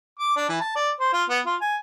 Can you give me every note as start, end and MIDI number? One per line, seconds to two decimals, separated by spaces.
0.19 0.35 86
0.36 0.48 62
0.49 0.58 52
0.61 0.74 81
0.75 0.90 74
1.00 1.10 72
1.13 1.23 65
1.29 1.40 59
1.46 1.56 65
1.61 1.77 80